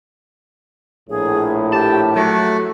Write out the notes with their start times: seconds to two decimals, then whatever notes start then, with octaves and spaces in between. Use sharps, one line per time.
1.10 A#1 A2 G#4
1.72 G4 A5
2.16 F#3 A3 F#4 A4